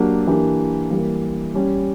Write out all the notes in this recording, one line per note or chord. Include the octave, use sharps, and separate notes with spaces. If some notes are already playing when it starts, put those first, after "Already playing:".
Already playing: F#3 A#3 D4 G4
E3 A#3 D4 G4
E3 G3 A#3
G3 C#4 G4